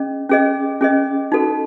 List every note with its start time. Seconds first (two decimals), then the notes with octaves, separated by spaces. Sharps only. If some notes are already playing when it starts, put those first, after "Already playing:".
Already playing: C#4 G#4 D#5
0.30 C#4 G#4 D#5
0.81 C#4 G#4 D#5
1.32 D#4 F#4 A4